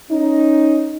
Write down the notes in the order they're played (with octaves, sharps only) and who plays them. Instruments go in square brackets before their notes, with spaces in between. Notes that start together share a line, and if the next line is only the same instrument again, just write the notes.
[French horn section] C#4 D#4